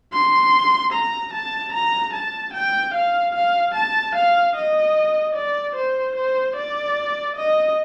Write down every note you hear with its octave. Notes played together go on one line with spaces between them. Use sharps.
C6
A#5
A5
A#5
A5
G5
F5
F5
A5
F5
D#5
D5
C5
C5
D5
D#5